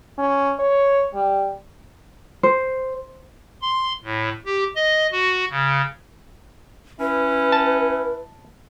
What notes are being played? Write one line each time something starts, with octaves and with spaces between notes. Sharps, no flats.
C#4
C#5
G3
C5
C6
A2
G4
D#5
F#4
C#3
C#4 E4 B4
A5